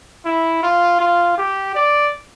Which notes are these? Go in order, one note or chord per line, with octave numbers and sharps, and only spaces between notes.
E4
F4
F4
G4
D5